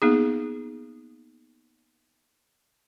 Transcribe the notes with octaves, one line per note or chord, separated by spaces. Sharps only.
A#3 B3 D#4 G#4